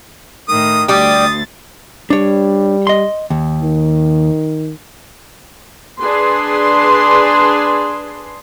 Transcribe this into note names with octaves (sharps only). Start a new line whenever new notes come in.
A2 D#3 D#6
D2 G3 G4 D#6 A6
G3 D4 C#5
D#5 C6
D#2
D#3
D4 G#4 B4 C6